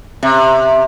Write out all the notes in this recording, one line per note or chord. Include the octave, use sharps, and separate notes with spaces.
C3